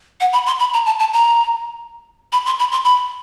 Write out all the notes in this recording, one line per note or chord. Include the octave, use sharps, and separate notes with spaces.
F#5
B5
C6
B5
A#5
A5
A5
A#5
B5
C6
B5
C6
B5